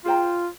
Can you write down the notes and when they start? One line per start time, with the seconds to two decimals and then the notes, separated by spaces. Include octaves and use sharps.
0.05 F4 G#4 C5 G5 A#5